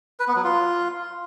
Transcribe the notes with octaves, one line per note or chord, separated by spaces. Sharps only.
B4
B3
F#3
F4